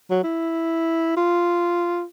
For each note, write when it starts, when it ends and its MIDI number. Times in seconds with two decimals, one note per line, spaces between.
0.10 0.23 54
0.23 1.14 64
1.16 2.03 65